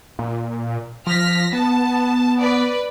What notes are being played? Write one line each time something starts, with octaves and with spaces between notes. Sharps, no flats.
A#2
F3 F6 A#6 B6
B3 A5
B4 D5